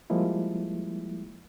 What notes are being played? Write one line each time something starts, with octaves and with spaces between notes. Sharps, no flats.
F3 G3 G#3 A#3 E4